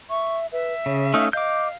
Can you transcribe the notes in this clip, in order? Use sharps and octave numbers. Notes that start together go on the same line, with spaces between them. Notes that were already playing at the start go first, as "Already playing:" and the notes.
E5 C#6
B4 E5
C#3 C#5
A3 C#4 D#4 F5
D#5 F5 D6 G6